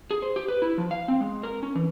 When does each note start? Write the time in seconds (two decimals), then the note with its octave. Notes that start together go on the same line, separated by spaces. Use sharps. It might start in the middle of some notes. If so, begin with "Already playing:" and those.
0.11 G#4
0.22 C5
0.36 G4
0.48 B4
0.62 E4
0.78 F3
0.91 F5
1.08 C4
1.20 G#3
1.43 A#4
1.63 C#4
1.75 E3